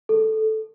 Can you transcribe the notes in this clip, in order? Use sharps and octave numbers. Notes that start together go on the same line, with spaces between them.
A4